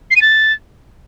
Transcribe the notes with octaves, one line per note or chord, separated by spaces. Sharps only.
C7
D#7
A6